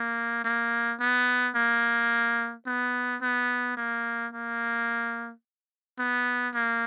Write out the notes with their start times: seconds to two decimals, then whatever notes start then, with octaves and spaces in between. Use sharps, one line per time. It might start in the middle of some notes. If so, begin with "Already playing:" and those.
Already playing: A#3
0.44 A#3
1.00 B3
1.55 A#3
2.66 B3
3.22 B3
3.77 A#3
4.33 A#3
5.98 B3
6.54 A#3